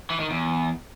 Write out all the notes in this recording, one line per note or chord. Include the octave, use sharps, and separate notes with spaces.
E3
D#3
E2